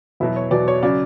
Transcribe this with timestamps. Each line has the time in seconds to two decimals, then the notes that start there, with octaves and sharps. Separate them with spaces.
0.20 E2 B2 F#3 E4
0.36 C#5
0.51 E2 B2 F#3 D5
0.68 C#5
0.83 C#3 F#3 D5